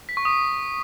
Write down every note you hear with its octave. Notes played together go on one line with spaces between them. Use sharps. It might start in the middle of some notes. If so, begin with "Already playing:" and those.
B6
C#6
D#6